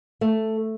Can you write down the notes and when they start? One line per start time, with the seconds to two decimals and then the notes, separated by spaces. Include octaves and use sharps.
0.21 A3